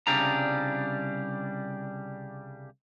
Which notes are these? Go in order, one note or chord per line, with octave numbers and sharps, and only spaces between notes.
C2 C#3 G3 D4 A#5